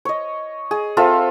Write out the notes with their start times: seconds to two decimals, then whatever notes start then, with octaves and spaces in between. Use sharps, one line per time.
0.05 C#5 D#5
0.71 G#4
0.97 C4 F4 A4 E5